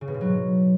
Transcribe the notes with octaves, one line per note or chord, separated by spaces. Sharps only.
C#3
B2
G#2
F#3